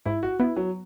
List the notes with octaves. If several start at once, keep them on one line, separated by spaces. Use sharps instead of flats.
G#2 E4
F#4
B3 E4
F#3